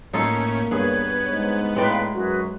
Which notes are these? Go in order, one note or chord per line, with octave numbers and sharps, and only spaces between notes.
A2 A#3 C#4 D#4 F4 A4
G2 B3 G#4 C#5
G#2
A2 G#3 D#4 B4 D5 F5 G5
F#2 F#4 G#4 B4